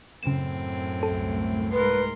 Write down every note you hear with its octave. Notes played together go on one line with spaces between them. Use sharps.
F#2 A2 C#3 C4 E7
C2 A3 A4
G#2 A#4 B4 C6